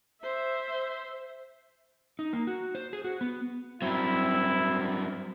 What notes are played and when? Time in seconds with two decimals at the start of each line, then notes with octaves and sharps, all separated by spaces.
0.22 C5 E5
2.19 D#4
2.33 A#3
2.47 F#4
2.75 C5
2.93 G#4
3.04 F#4
3.21 B3
3.82 G2 F#3 C4 E4